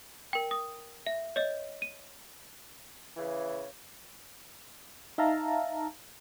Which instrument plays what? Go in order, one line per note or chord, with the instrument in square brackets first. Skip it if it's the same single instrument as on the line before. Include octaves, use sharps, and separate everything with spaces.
[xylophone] A#4 G5
D#6
E5
C#5 D#5
D#7
[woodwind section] C#3 E3
[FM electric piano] D#4 E5 F5 A5 A#5